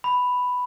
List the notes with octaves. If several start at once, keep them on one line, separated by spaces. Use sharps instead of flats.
B5